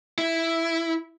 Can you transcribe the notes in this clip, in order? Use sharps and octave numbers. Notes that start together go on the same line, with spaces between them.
E4